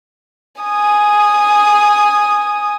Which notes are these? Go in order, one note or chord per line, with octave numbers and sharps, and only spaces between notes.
G#5 D#6